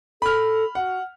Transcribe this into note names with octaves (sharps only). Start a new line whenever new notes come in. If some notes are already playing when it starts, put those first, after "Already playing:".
A4 B5 F6
F#4 F#5